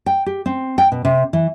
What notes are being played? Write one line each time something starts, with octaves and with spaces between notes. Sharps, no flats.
G5
G4
C4
G5
B2
C3
E3